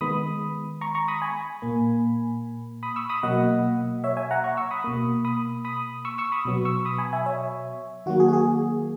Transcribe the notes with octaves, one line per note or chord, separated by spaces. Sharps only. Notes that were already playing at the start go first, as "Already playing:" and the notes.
D#3 G#3 B3 B5 D#6
A#5 C#6
A#5 C#6
B5 D#6
G#5 B5
A#2 A#3
B5 D#6
C#6 E6
B5 D#6
B2 F#3 A#3 D#5 F#5
C#5 E5
E5 G#5
F#5 A#5
A#5 C#6
C#6 E6
B5 D#6
B2 A#3
B5 D#6
B5 D#6
C#6 E6
C#6 E6
B5 D#6
B2 F#3 B3
C#6 E6
B5 D#6
G#5 B5
E5 G#5
C#5 E5
D#3 F#3 A#3 F#4
G#4
F#4
G#4